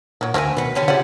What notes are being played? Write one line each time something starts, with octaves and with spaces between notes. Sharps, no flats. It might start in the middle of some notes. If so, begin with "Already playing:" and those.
A#2 D#3 F#3 A#4
D2 A#3 C4 F#4 A#4 E5 G#5
B2 D#3 B4 F#5
D3 C#4 G4
C#3 C#4 E4 F4 G4 D5 F#5